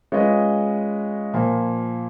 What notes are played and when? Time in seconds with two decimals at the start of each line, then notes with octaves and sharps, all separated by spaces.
0.12 G#3 C#4 F4 B4 D#5
1.34 A#2 F3 A#3